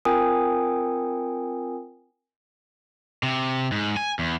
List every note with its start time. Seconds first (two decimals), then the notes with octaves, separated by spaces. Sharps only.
0.05 C4 F4 A#4 G5 G#5 D#6
3.23 C3
3.72 G#2
3.97 G#5
4.19 E2